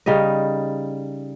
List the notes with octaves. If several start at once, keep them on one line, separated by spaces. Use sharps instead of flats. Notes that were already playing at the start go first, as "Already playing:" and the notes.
C#3 G3 D#4 D#5